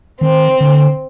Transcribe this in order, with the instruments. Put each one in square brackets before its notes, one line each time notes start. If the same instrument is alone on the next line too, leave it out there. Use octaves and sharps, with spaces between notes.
[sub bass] D#3 [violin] C4
[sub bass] D3